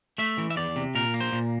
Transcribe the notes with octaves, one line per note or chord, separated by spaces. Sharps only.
A3 E5
E3
E5
E2 D5
C3
A#2 A#4
A#3
C5
A#2